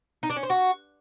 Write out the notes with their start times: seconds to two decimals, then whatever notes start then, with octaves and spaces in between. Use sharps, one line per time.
0.23 D#4
0.30 D4
0.36 C#4
0.43 C5
0.50 F#4